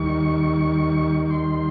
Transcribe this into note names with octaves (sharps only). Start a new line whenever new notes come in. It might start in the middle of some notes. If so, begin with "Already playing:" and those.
Already playing: D#2 D#3 G3 C#6
C#6
C6